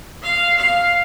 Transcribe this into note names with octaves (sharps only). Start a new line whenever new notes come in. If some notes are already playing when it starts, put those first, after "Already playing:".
F5
F5